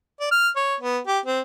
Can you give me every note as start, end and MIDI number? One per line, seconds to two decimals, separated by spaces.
0.20 0.29 74
0.31 0.49 89
0.56 0.75 73
0.80 0.98 59
1.07 1.19 67
1.26 1.40 60